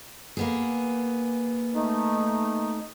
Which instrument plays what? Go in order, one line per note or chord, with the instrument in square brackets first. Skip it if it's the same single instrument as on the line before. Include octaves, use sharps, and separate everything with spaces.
[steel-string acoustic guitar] A#3 B3 G#4
[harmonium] A3 D#4